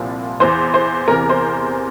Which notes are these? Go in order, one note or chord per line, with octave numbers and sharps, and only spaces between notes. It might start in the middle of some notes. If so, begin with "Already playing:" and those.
Already playing: C2 A#2 F3
E2 E3 C5
C5
E2 C3 E3 A#4
C5